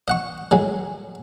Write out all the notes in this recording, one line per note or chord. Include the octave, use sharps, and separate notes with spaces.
D#5 F#5 C#6
A2 F#3 G#3